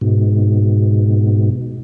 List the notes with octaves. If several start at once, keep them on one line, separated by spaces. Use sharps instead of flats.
G#2 B2